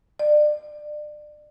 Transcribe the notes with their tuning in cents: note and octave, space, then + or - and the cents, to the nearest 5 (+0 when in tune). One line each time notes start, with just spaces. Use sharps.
D5 +30